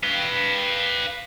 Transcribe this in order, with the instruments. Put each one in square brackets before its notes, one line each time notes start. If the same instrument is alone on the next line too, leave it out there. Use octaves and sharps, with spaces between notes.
[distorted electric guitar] B4 F5